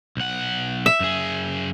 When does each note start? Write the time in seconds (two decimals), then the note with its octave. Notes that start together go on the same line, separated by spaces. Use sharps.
0.17 B1 F#5
0.86 E5
1.00 F#2 G#4